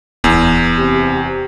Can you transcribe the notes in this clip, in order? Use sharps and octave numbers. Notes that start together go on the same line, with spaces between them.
D1 E2
C3 G4